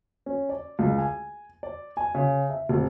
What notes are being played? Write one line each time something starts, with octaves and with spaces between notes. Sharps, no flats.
C#4
D5
C#2
G#5
D5
G#5
C#3
E5
F1